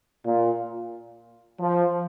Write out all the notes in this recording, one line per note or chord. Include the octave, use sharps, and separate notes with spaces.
A#2
F3